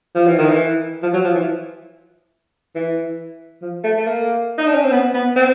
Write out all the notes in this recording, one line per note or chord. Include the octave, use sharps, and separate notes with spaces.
F3
E3
D#3
E3
F3
F#3
F3
E3
E3
F3
A3
A3
A#3
D#4
D4
C#4
C4
B3
B3
C4